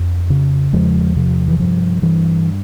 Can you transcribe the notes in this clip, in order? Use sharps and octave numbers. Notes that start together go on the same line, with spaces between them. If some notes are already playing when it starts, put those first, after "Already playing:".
Already playing: F2
C#3
E2 F3 G#3
C3 F3
E3
G2 F3
G2 E3